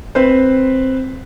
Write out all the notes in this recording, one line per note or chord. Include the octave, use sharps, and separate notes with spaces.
C4 B4 C5